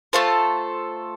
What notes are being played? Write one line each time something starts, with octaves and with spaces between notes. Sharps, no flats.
A3 F4 A4 C5